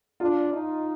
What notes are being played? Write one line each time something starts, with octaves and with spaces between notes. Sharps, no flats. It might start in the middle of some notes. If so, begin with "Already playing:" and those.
D4 F4
D#4